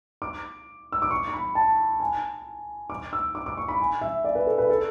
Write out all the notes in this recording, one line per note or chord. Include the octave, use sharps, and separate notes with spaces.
D6
E6
D6
C#6
C#6
B5
A5
G#5
D6
E6
D6
D6
C#6
B5
G#5
E5
D5
B4
A4
B4
A4